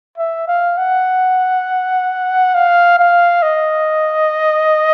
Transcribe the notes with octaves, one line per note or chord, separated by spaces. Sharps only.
E5
F5
F#5
F5
F5
D#5